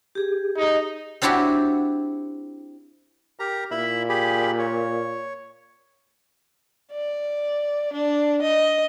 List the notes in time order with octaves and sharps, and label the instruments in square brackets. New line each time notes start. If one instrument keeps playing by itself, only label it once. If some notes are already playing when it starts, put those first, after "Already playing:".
[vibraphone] G4 G#4
[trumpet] D#4
[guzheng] C4 D4 E4 F#4 G4
[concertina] G4 A#4 A#5
[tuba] A#2 [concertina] E4 E5 B5
[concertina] G4 G#4 B5
C#5
[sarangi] D5
D4
D#5